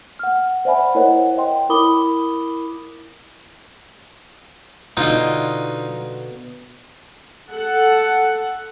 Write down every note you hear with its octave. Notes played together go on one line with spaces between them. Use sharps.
F#5 F6
C5 D5 E5 F#5 G#5 B5
E4 A#4 C5 C#5 D#5 F#5
C#5 D#5 G5 C6
E4 A#4 B5 D6 D#6 G7
B2 D3 D#4 F4 D#5
A4 F#5